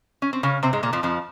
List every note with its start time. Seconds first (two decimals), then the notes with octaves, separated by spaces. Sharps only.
0.22 C#4
0.33 C4
0.43 C#3 C#4
0.63 C3 C4
0.73 G#2 G#3
0.83 A#2 A#3
0.93 F2 F3
1.03 F2 F3